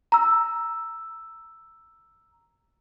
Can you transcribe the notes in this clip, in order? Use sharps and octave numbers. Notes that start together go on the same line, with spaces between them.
A#5 E6